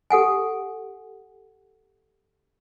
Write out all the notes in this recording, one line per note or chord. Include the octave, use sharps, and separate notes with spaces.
G4 A4 F#5 G#5